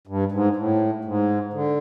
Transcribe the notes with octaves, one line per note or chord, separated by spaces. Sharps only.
G2
G#2
A2
G#2
D3